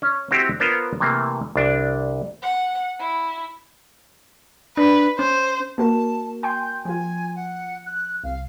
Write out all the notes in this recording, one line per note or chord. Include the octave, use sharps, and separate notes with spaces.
C#4
C4 E4 F#4 G4
B3 F4 A#4 C5 C#5
C3 E3 A3 A#3
C2 D4
F#5
E4
D4 B4
C#4 C5
A#3 F#4 A#4 A5
G5 G#5 C6 G6
F3 F4 G#5
F#5
F#6
C2 F5